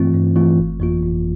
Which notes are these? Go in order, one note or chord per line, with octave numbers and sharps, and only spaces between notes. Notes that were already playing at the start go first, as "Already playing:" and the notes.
Already playing: G2 E3 A3 C4 F4
G2
E3 A3 C4 F4
G1
F2 E3 A#3 F4
G1